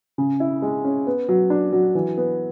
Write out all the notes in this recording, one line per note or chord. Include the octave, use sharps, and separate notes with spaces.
C#3
E4
G#3
C#4
B3
F#3
D4
F#3
E3
B3